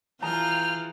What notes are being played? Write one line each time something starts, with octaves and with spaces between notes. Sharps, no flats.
E3 F4 G#4 G5 A#5 F6